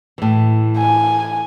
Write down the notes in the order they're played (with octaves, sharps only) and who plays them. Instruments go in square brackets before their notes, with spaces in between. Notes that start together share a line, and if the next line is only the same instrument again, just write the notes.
[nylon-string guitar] A2 E3
[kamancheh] G#5